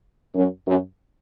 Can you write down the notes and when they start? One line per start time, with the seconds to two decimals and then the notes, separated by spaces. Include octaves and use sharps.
0.35 F#2
0.67 F#2